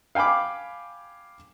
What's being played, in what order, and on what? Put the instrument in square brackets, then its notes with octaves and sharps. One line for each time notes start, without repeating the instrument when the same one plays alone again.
[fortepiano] F5 G5 G#5 B5 D6